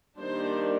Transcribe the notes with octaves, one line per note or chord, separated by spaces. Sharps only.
D#3 G3 A#3 D4 C5